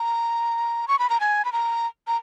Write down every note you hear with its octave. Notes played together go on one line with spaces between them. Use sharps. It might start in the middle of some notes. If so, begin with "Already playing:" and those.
Already playing: A#5
C#6
B5
A#5
G#5
B5
A#5
A#5